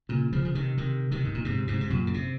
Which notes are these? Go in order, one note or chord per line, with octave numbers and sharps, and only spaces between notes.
A#2 C#3
C#3 F3
C#3
C3 D#3
C3 D#3
C3 D#3
G#2
A#2
G#2 C3
G#2 C3
C3
F#2 A#2
C#3
C3